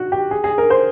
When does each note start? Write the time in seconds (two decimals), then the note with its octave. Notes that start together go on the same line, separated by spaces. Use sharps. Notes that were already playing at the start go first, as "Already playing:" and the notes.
Already playing: F#4
0.12 G4
0.31 G#4
0.44 G#4
0.58 A#4
0.70 C5